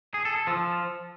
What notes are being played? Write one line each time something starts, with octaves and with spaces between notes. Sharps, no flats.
G#4
A4
A4
F3